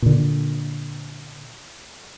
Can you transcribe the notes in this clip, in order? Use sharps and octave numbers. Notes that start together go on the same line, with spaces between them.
A#2 D3